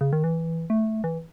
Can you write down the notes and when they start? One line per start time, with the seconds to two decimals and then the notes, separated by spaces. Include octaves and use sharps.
0.01 C#3
0.13 D#3
0.24 E3
0.70 A3
1.04 E3